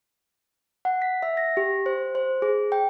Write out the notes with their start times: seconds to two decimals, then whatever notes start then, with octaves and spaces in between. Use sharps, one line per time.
0.85 F#5
1.02 B6
1.23 E5
1.37 A#6
1.57 G4
1.86 C5
2.15 C5
2.42 G#4
2.72 G5